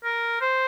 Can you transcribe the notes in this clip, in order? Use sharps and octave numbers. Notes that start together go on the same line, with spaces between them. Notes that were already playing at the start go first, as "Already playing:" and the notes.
A#4
C5